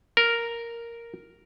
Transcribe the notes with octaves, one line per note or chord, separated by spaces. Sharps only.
A#4